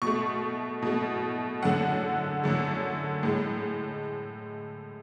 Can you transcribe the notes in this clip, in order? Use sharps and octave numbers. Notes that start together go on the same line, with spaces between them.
B2 A3 C#6
B2 A3
F#2 D3 A3 F#5
F#2 D3 A3
A2 G#3